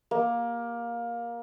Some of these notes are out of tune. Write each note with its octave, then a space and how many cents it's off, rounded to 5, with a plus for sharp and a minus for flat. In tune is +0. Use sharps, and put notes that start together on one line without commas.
A#3 +15